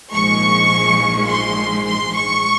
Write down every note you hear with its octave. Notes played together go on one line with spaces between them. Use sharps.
A#1 G#2 F3 G#3 C#6
C6
C6
C#6